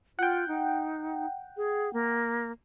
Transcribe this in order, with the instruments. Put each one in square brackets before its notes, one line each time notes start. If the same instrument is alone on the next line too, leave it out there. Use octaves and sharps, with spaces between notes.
[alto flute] F4 [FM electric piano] F#5 G5
[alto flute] D#4
G#4
A#3